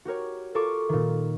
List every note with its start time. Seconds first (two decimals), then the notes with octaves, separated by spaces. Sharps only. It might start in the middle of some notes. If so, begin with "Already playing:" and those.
0.05 F#4 G4 A#4 C#5
0.55 F4 A4 A#4 C#6 D6
0.89 A#2 D#3